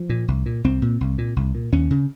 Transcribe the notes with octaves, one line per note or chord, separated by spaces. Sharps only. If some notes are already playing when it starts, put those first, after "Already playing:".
Already playing: F3
A#2
C2
A#2
C2 C4
A#2
C2
A#2
C2
A#2
D#2 C#4
C#3